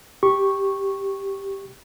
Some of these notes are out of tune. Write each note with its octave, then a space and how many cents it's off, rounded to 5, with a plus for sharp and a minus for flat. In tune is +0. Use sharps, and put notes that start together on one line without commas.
G4 +0 C#6 -10